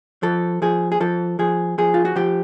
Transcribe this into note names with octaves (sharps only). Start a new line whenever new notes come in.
F3 A4
F3 G#4
G#4
F3 A4
F3 G#4
F3 G#4
F4
F#4
F3 G4